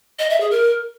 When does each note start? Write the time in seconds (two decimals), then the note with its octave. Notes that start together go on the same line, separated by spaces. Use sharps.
0.19 D#5
0.30 E5
0.40 G#4
0.51 A#4